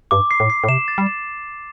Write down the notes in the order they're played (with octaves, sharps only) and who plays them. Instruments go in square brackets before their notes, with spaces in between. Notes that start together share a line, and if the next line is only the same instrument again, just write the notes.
[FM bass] G2 [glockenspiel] D6
[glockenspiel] C7
[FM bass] A2
[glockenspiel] C7
[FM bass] A2
[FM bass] C3 [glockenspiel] E7
[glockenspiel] A6
[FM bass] G3
[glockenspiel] E7